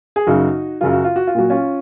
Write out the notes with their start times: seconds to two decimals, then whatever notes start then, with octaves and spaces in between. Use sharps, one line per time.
0.16 G#4
0.27 F#2 C#3 F#3 D#4 F#4
0.81 F#2 C#3 F#3 F4
0.93 F#4
1.04 F4
1.16 F#4
1.27 F4
1.35 A#2 F#3 F#4
1.50 C#4 F4